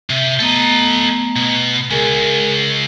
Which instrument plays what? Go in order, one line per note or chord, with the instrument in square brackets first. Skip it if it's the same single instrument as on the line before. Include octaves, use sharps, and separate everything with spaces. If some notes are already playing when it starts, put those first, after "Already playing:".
[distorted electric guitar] C3 [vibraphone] E5
[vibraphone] A3 B3 A#5 [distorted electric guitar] A4 D#5
[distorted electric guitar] B2
[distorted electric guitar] C#2 [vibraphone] G#4 A#4 G#5